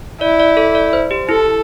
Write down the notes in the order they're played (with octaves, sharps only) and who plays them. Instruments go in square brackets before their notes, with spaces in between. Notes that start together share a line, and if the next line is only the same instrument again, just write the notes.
[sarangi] E4 [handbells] D5
[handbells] D5
A4
D5
C5
G4
[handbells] E4 [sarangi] A4